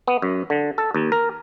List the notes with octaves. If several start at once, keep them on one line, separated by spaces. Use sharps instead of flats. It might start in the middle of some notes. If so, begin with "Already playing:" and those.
B3
F#2
D3
A4
D#2
A#4